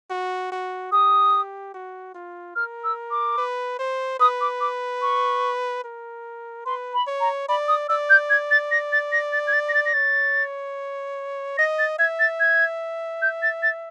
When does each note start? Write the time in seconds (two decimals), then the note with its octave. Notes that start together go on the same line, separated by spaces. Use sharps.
0.10 F#4
0.52 F#4
0.92 G4 D#6
1.74 F#4
2.15 F4
2.56 A#4 F6
2.84 E6
3.11 D6
3.38 B4
3.79 C5
4.20 B4 D#6
4.41 D6
4.61 D6
5.02 C#6
5.84 A#4
6.66 B4 C6
6.94 B5
7.07 C#5
7.21 A#5
7.49 D5 B5
7.68 D#6
7.89 D5 E6
8.10 G6
8.30 G#6
8.51 A6
8.71 A#6
8.92 A6
9.12 A#6
9.33 A6
9.47 G#6
9.53 A6
9.69 A#6
9.74 A6
9.85 A#6
9.94 C#5 A6
11.58 D#5 A#6
11.79 A6
11.99 E5 G#6
12.19 A6
12.40 G#6
13.22 G6
13.42 A6
13.63 A6